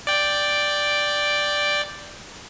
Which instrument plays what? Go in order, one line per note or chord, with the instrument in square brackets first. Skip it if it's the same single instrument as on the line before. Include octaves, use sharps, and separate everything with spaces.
[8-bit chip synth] D5 G5